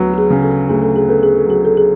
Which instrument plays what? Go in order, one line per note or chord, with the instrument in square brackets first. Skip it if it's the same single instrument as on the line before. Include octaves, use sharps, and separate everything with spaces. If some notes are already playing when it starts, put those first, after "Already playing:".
Already playing: [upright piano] D2 F#3 B3
[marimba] F#4
G#4
[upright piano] C#3
[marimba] A4
[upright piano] D2 [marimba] G#4
[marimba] A4
G#4
[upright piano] B3 [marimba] A4
[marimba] G#4
A4
[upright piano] F#3 [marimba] G#4
[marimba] A4
G#4